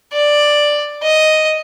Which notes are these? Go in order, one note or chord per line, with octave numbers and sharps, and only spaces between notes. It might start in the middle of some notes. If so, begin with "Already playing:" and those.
D5
D#5